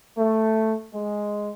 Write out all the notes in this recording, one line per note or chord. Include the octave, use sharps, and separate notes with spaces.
A3
G#3